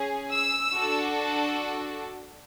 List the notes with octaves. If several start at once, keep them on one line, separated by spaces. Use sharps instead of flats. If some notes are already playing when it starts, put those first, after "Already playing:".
Already playing: C#4 G#4
E6
D4 F#4 A4